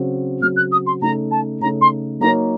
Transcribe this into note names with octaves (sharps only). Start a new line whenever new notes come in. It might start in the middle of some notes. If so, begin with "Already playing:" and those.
Already playing: C#3 F#3 C4 F#4
C#3 F#3 C4 F#4 F6
F#6
D#6
C6
C#3 A3 D#4 A4 A#5
A5
C#3 A3 D#4 A4 A#5
C6
F#3 A#3 D#4 A#4 C#5 A#5